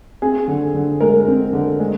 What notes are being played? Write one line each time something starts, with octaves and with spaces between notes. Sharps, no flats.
C4 G#4
D3
D3
G#3 A#4
C4
D3
G#3